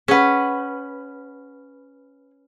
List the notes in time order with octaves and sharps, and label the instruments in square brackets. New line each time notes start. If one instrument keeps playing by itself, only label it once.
[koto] C#4 B4 [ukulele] G#4 F#5